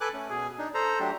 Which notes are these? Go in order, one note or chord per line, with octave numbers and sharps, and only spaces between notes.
A4 B4 G#5 D6 F#6
A3 C#4
B2 G#4 G#5
D4 D#4
A4 C5 A#5
F#3 A3 D4 G4